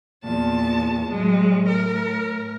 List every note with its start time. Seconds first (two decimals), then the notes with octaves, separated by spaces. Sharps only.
0.24 E2 A#2 A5
1.09 A2 F#3 G#3
1.68 A#4